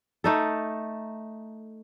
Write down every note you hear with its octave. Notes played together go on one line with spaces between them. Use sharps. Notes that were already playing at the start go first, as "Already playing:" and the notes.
A3 D#4 A4